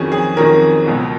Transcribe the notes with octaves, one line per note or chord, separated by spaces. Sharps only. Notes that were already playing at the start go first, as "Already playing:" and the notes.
Already playing: F2 D#3 F#3 C#4 G#4
G#4
F2 D#3 F#3 C#4 A#4
C#2 B2 F#3